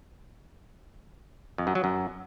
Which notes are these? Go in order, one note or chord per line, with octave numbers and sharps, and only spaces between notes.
F2
F#2
F#3
F#2